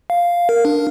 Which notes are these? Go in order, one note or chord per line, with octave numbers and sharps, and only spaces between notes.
F5
A#4
D4